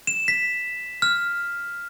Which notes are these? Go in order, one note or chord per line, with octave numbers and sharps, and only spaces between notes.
E7
B6
F6